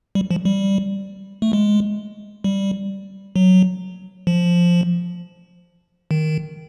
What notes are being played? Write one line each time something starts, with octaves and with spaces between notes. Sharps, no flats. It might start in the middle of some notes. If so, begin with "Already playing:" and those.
G3
F3
G3
A3
G#3
G3
F#3
F3
D#3